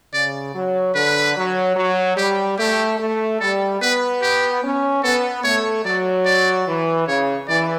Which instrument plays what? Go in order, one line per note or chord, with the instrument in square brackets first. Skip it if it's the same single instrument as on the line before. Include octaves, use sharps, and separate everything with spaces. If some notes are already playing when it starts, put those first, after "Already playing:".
[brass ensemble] C#3 [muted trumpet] D5
[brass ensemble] F#3
[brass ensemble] D3 [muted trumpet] B4
[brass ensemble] F#3
F#3
[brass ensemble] G3 [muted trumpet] G4
[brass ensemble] A3 [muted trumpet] G4
[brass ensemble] A3
[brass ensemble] G3 [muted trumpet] A4
[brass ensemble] B3 [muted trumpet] B4
[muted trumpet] G4
[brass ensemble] C#4
[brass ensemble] B3 [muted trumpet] A4
[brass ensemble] A3 [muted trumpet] C#5
[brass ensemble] F#3 [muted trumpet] D5
[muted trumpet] D5
[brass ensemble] E3
[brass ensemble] C#3 [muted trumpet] C#5
[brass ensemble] E3 [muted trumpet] D5